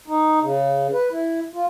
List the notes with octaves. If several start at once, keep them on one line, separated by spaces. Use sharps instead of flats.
D#4
C#3
B4
E4
F4